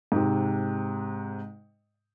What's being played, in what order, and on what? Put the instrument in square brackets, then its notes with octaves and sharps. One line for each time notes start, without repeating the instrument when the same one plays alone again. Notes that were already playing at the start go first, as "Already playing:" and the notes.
[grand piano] G#2 C3